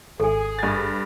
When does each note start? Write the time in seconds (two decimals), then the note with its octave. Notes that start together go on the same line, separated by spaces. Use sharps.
0.20 G#1 G#4 A4 G#5
0.59 G2 A6